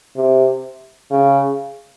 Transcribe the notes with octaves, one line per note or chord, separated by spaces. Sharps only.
C3
C#3